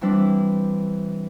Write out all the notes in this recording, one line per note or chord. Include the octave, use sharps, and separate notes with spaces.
E3 G3 C4 D4 E4